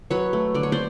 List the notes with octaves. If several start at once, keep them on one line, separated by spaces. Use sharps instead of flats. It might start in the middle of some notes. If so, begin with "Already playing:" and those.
F#3 B4 C#5
A3
D3 D5
C#5
C5 D5